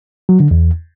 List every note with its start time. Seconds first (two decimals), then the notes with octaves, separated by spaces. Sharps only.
0.29 F#3
0.40 D3
0.51 E2